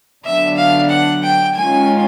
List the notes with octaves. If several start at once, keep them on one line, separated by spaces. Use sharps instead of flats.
D3 F#3 B3 D4 E5
F5
F#5
G5
D#3 G#3 C#4 F4 G#5